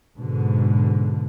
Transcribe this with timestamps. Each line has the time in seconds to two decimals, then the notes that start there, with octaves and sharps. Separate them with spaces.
0.18 G#2 B2 D3